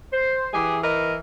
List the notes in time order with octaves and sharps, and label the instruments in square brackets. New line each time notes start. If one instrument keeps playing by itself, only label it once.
[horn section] C5
[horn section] E3 [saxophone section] G4 G#4
[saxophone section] A#4 B4 D#5